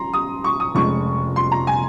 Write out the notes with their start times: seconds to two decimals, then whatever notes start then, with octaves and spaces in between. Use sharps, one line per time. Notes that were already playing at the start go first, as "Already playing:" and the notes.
Already playing: C#3 A#5 C6
0.14 D#6
0.44 C#6
0.60 D#6
0.75 F1 F2 C#3 G#3 C#6
1.36 C6
1.52 A#5
1.67 G#5